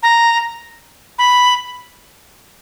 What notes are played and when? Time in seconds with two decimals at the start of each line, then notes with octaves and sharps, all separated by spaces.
0.03 A#5
1.19 B5